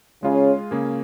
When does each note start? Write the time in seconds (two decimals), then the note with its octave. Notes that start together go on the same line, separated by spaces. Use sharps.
0.23 C#3 G#3 F4 G#4
0.71 C#3 A#3 C#4 G#4